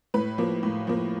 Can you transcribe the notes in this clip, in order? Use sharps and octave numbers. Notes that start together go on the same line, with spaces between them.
A2 B4
F3 A#3
A2
F3 A#3